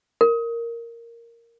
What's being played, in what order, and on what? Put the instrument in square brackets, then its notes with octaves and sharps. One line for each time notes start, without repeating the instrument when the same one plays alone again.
[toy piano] A#4